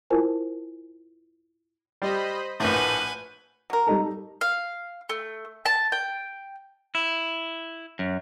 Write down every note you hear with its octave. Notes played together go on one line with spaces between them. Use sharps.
E4 F4 A#4 C5 G#5 A5
G3 C5 D#5 B5
A#1 A2 B4 F#5 G#5 F#6 G6
F#3 A#4
G3 D#4 A4
F5
A3
A5
G5
E4
F#2